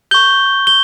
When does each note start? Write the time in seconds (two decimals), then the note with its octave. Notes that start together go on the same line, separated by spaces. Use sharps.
0.11 C#6 G6 G7
0.67 G7